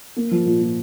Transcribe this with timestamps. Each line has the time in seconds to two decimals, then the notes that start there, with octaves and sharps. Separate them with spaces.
0.16 A#3
0.31 F3
0.46 A#2
0.61 A#2